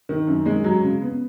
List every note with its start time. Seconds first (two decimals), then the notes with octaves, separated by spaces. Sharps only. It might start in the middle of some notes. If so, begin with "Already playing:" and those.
0.09 D#3
0.27 F#2
0.46 G#3
0.64 F#3
0.83 C#3
1.02 B3